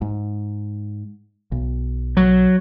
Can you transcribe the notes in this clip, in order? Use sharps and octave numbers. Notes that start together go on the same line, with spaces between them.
G#2
B1
F#3